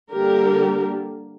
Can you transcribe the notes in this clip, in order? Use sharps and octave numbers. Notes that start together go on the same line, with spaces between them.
D3 G3 A#3 D4 G4 A#4